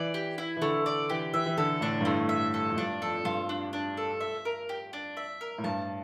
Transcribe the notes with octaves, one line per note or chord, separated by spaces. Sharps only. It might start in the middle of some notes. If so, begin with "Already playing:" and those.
Already playing: E3 D5
G4
E4
E3
D3 A3
D5
E3 G4
E3 E5
E3
D3 A4
A2 D4
G2
A2 A3
E5
A4
F2
G2 D4
F2 A4
G2 F4
D4
D4
A4
E5
A#4
G4
D4
E5
A#4
A2
G2 A5